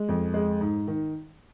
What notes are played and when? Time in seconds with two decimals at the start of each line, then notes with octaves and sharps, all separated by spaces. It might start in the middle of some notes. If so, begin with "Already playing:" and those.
Already playing: G#3
0.09 F2
0.34 G#3
0.61 G#2
0.88 D#3